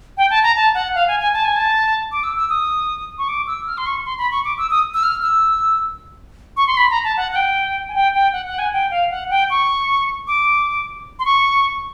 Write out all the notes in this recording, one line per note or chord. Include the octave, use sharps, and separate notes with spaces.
G5
A5
A#5
A5
F#5
F5
G#5
G#5
A5
G#5
A5
D6
E6
E6
D#6
C#6
D6
E6
F6
C6
C#6
C6
B5
C#6
D6
E6
D#6
E6
F6
E6
C#6
C6
B5
A#5
A5
F#5
F#5
G5
G#5
G5
G5
F#5
F#5
G#5
G5
F5
F#5
G5
C#6
D6
C6
C#6